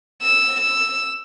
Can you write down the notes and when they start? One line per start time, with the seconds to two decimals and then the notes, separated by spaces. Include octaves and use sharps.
0.23 E6
0.61 E6